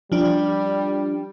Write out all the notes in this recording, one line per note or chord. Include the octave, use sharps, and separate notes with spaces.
F3 G3 D4